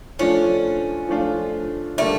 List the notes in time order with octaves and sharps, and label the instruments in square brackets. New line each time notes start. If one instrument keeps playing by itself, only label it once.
[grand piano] F3 A3 D4 F4 [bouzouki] C#4
[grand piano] F3 A3 D4 F4
[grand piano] D3 G3 A#3 D4 [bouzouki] A3